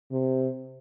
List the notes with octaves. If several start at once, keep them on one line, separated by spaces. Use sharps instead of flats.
C3